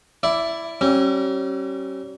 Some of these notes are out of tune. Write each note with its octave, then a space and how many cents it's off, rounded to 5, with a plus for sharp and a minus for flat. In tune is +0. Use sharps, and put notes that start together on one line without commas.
E4 +10 D5 -5
G3 -40 C#4 -35